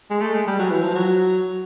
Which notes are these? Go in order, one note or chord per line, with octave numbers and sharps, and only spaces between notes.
G#3
A3
G#3
G3
F#3
E3
F3
F#3